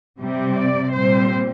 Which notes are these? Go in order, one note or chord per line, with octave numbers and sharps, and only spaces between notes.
C3 G3 C4
D5
A#2 G3 C4 C5